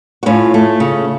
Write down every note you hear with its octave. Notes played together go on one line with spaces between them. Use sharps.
F#4
A2 C#4 F4
A3
C#3